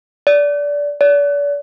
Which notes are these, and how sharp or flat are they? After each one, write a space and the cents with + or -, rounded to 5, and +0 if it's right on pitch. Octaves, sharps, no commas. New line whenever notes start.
D5 -15
D5 -35